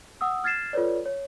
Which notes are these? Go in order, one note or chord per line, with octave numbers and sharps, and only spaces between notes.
F#5 D#6 E6
F6 G#6 A6 C7 E7
F4 A4 B4 C#5 D5
C#5